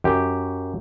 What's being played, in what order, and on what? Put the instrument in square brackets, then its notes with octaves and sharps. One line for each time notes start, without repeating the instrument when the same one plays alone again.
[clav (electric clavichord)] F#2 G4